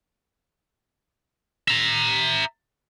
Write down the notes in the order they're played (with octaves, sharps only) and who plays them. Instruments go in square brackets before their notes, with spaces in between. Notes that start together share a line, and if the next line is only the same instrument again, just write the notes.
[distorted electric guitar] E5 A#5